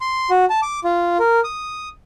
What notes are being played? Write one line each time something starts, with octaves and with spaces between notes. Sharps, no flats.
C6
F#4
A5
D6
F4
A#4
D#6